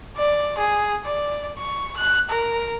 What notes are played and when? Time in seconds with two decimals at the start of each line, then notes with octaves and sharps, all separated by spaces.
0.17 D5
0.58 G#4
1.05 D5
1.58 C#6
1.97 F#6
2.30 A#4